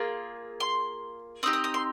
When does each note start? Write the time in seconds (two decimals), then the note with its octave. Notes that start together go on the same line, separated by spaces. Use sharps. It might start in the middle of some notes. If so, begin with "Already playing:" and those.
Already playing: A#3 F4 G#4 C6
0.60 C6
1.43 C4 D#4 G4 D#6
1.53 D#6
1.64 D#6
1.74 C6